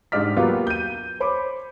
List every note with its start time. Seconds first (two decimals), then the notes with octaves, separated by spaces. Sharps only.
0.12 G#2 D4 G4 D5 F6 B6
0.37 F#3 A#3 B3 F4 G4
0.67 G6 D#7
1.20 C5 C#5 B5 D6